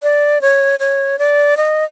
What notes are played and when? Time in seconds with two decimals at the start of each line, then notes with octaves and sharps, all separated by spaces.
0.03 D5
0.41 C#5
0.79 C#5
1.19 D5
1.57 D#5